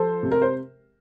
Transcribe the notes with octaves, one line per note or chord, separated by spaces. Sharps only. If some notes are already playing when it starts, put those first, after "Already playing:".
Already playing: F3 A4 C5
C3
A#4
C5